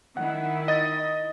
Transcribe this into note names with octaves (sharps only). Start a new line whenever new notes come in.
D#3 E4 F#5
D#5 A6